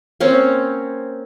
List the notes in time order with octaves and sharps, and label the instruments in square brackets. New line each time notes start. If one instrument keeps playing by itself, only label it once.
[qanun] A#3 C4 C#4